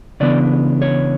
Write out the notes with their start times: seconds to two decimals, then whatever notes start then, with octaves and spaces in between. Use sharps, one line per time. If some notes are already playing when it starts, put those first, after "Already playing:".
0.20 C#2 C#3 E3 B3 D4 D5
0.82 C#5